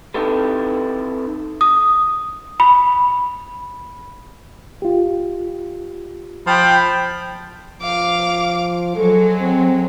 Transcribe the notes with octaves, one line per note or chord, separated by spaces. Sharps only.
C4 D#4 E4 G4 A4 B4
D#6
B5
F4 G4
F3 G5 B5
F3 F5 D6
F#3 G#3 A4
C4